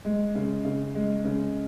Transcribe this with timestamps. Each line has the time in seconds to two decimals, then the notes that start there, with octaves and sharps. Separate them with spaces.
0.05 G#3
0.35 C#3
0.65 C#3
0.95 G#3
1.25 C#3